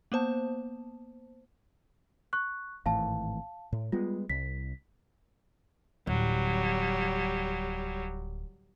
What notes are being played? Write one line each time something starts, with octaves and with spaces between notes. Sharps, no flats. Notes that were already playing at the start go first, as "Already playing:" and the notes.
A#3 B3 C5 A5
C#6 F#6
G#1 A2 E3 F5 A5
A2
G3 G#3 B3 F4
C2 B6
D1 F#3 G3